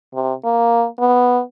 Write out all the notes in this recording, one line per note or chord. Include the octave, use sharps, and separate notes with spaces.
C3
A#3
B3